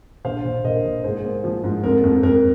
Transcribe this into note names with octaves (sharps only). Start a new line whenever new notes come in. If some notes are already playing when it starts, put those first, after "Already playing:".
A#1 C5 F5
A#1
A#1 A#4 D#5
A#1
G#2 G#4 C5
A#3
F3
G#2
F2 A#4
F2
F2 A#4